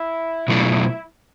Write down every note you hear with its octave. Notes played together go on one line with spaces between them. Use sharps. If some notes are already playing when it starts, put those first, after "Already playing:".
Already playing: E4
B2 F#3 A3 D4 E4 F4